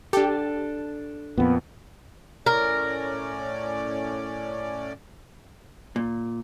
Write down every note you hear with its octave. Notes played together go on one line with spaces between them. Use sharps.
D4 G4 A4
F2 A#2 B3
A2 C#4 A#4 D5
A#2